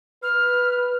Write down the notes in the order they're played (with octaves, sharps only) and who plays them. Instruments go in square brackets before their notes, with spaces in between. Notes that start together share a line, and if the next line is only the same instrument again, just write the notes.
[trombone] B4 [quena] F6